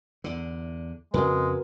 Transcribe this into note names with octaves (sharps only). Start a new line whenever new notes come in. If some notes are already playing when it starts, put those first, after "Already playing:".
E2 D3
F2 C#3 G#3 C4 F#4 A#4 B4